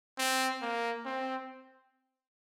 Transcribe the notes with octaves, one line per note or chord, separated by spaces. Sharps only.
C4
A#3
C4